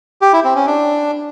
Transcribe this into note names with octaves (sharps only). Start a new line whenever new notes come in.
G4
E4
C4
C#4
D4